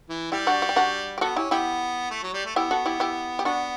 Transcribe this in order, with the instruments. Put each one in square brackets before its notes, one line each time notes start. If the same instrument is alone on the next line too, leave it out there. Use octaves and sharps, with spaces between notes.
[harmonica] E3
[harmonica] G3 [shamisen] E4 G4
[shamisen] D4 F#4
F#4
G4
D4 F#4
G4
[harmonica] B3 [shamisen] F#4 A4
[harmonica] C#4 [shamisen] E4 G4
[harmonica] B3 [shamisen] E4 G4
[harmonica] A3
F#3
G3
A3
[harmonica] B3 [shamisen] E4 G4
[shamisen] F#4 A4
E4 G4
E4 G4
G4
[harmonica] B3 [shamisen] D4 F#4